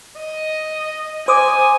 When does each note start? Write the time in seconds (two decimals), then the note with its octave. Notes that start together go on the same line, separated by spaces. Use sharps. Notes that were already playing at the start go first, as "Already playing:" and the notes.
0.18 D#5
1.28 C5 G#5 D6 D#6